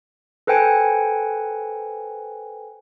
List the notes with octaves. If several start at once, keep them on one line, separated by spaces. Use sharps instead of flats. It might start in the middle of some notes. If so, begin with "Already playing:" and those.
A4 B4 C5 G5 G#5 C#7